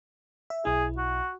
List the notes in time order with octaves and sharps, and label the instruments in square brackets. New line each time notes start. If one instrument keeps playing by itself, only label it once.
[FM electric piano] E5
[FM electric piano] B1 E4 [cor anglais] G#4
[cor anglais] F#4